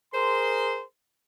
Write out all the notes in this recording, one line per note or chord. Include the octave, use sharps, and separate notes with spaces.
G#4 A#4 C5 C6